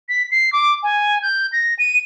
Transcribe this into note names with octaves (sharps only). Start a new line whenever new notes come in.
B6
C7
D6
G#5
G6
A#6
D#7